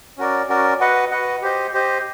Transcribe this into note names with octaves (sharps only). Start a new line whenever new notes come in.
C#4 F#4 A#4 D5
C#4 F#4 A#4 D5
F#4 B4 D#5 F#5
F#4 B4 D#5 F#5
G4 C5 D#5
G4 C5 D#5